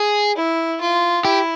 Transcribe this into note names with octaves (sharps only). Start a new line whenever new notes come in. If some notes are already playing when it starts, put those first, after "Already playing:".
Already playing: G#4
E4
F4
E4 G4